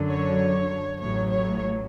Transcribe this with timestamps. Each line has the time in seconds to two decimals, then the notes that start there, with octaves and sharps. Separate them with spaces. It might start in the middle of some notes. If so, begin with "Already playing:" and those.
Already playing: F#2 D3 F#3
0.10 C#5
1.01 A1 A2 F#3 C#5
1.31 C#5